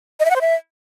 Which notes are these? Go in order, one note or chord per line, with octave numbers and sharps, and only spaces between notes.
D#5
E5
F#5
C5
E5